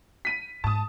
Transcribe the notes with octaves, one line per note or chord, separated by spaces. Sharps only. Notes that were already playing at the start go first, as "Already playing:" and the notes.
B6 D#7
G#2 A5 D#6